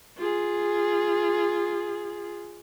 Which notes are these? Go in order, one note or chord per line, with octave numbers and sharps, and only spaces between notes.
F4 G#4